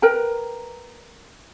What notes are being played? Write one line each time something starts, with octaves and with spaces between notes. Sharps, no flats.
A#4 B4 G5 A#5